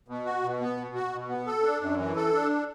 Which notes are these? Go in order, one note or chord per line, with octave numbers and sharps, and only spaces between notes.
B2
F#4
B2
B3
B2
F#4
B2
B3
A4
D4
F#2
E3
A4
D4